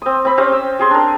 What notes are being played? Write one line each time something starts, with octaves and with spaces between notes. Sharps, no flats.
C4 D#6
C4 B5
C4 C#4 G4
E6
G4 G#4 C6
D4 A#4